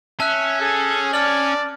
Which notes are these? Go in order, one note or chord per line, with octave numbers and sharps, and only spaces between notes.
C#4 E5 A5 F#6
G#4 A4
D5 A5 F6 F#7